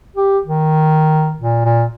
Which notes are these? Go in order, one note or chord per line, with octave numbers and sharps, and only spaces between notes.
G4
D#3
A#2
A#2